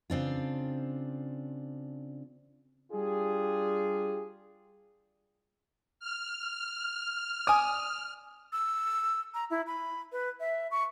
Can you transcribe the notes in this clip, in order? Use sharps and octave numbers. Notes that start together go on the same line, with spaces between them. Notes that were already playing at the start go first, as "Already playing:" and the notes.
C#3 C4 D4 F4
G3 D4 F4 G4 G#4
F6
D5 G#5 D#6
E6
A#5
E4
B5
B4
E5
C#6